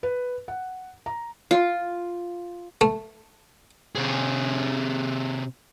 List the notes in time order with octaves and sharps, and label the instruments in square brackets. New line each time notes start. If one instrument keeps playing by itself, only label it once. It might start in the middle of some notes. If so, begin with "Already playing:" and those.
[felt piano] B4
F#5
A#5
[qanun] F4
[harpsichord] A3
[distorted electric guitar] C3 G#4